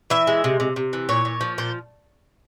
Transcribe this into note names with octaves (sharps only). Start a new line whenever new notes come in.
E3 E5
G#3
C3
C3
C3
E3
A#2 C#5
A#2
F3
A#2 C5